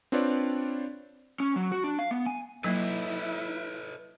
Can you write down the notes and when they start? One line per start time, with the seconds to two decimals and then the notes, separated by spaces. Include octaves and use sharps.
0.12 C4 D4 F4 B4 C#5 D5
1.40 C#4
1.56 F#3
1.72 F#4
1.84 D4
1.99 F5
2.11 B3
2.26 G#5
2.64 F#3 A#3 E4 A4 B4 D#5 E5